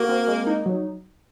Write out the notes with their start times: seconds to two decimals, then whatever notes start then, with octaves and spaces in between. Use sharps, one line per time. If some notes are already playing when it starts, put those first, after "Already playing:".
Already playing: A#3 F#4
0.09 C4
0.28 G#3
0.47 D#4
0.66 F#3